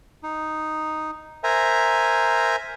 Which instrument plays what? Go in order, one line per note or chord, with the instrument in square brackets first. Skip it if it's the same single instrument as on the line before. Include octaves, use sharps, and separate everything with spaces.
[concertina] D#4
A#4 C5 E5 G#5 A#5